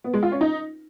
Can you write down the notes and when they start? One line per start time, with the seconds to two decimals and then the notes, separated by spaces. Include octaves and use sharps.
0.04 B3
0.14 G#3
0.23 F4
0.32 C#4
0.41 D#4